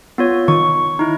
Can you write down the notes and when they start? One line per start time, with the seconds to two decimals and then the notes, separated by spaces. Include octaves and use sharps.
0.18 B3 F4 C#5
0.48 D#3 C#6
0.99 D#4 E4